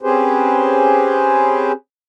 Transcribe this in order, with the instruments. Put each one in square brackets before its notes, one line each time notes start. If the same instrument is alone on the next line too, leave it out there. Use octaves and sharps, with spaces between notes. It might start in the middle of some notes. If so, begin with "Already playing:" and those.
[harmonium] C4 C#4 G4 G#4 B4 C5